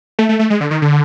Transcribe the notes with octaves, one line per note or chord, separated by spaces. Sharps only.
A3
A3
A3
G#3
D3
D#3
D3